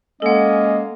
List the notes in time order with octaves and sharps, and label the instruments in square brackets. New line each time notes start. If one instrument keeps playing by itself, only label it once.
[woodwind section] G#3 A#3 C#4 [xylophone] A4 F#5 [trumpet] D#5